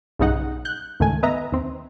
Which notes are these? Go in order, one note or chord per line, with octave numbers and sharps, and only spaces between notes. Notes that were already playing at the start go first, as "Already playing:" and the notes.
B1 G2 C#3 D#4 F#5
F#6 G6
C#2 G#2 D#3 A3 G#5
B3 B4 D#5 E5 A#5
D#2 C4